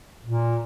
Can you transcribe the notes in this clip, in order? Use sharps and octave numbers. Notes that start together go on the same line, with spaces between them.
A#2